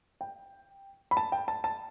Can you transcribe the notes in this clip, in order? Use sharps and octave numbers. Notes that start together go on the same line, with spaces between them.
G5
B5
A5
G5
A5
A5